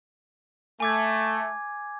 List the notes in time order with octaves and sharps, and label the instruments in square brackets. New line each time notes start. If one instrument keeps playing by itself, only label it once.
[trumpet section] A3 [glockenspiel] G#5 D6 G#6